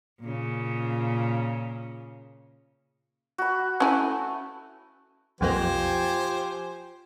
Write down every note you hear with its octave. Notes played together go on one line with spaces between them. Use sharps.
A#2 C#3
F#4 B5
A3 C#4 E4 G#5
B1 F2 F3 A#3 G4 C5 G#5